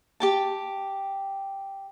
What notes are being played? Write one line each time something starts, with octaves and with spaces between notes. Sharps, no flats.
G4 G5 A5